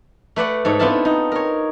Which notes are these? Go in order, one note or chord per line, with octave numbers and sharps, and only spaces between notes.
A3 B4 D5 F#5
G#2 A4 C#5
B3 C4 D4 E4 F4 A5
D#4
A#4 C#5